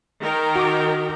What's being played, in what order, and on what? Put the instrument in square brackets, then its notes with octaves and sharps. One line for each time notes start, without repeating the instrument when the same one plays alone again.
[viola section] D#3 A#4 G5
[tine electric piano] F#4 D6